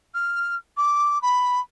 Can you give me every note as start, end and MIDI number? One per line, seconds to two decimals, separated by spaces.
0.14 0.55 89
0.77 1.21 86
1.22 1.60 83